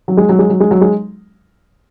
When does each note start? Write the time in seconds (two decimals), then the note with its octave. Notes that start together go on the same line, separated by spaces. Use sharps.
0.08 F#3
0.17 G#3
0.29 F#3
0.39 G#3
0.49 F#3
0.60 G#3
0.71 F#3
0.81 G#3